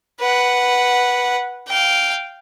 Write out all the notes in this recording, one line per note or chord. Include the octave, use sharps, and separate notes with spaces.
B4 F#5
F5 G5